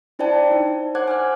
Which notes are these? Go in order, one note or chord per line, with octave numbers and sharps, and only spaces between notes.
D4 E4 C5 D5 G5 A5
D#4
C5 C#5 F#5 D6 F#6 G#6
G#5 F6 F#6